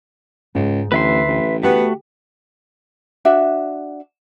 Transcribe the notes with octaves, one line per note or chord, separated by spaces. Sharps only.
C#2 G#2
A1 D2 B4 E5 C6
A1
A3 B3 F#4 G4
D4 F#4 E5